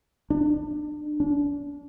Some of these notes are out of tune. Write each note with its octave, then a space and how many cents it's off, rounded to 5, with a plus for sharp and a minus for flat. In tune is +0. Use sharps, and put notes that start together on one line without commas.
D4 +30
D4 -35